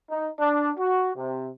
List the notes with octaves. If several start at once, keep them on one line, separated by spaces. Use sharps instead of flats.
D#4
D4
F#4
C3